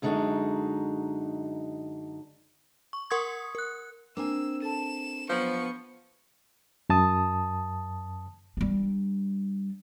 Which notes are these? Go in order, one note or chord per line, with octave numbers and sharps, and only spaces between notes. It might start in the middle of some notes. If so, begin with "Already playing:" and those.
F#2 D3 G#3 D#4 F4 F#4
C#6
A#4 F#5 C6 C#6 D#6 G#6
A#4 F#6
A#3 C4 D4 G#5 E6
A4 A5 E7
F3 F#3 B3 C#6
F#2 A5 D#6
G3 D4